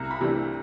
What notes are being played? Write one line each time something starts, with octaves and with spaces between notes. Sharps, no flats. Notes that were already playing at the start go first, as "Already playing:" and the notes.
Already playing: C2 A#5
B5
C3 E3 A3 D4